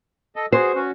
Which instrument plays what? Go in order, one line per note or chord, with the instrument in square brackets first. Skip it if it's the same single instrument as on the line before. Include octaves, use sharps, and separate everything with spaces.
[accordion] A4 D#5
[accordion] F#4 G#4 [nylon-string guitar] C5
[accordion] C#4 F#4